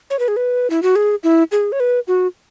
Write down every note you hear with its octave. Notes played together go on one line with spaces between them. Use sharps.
C#5
B4
G#4
B4
E4
F#4
G#4
E4
G#4
C#5
B4
F#4